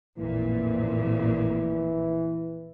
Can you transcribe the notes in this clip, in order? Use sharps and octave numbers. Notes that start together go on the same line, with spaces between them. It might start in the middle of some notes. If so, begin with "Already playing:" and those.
A1 F2 A#2 E3